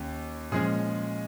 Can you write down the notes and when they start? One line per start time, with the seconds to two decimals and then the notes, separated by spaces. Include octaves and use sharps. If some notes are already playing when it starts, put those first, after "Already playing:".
Already playing: D#2 C#4
0.52 A#2 F3 G#3 C#4 G#4